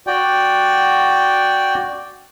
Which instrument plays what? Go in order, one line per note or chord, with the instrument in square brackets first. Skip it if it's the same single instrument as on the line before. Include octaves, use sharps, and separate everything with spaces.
[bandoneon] F#4 D5 G5